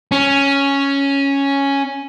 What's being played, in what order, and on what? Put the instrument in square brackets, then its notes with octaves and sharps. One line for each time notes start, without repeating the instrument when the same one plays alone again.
[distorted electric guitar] C#4